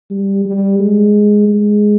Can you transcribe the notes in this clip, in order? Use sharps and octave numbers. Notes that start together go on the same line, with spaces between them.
G3
G3
G#3
G#3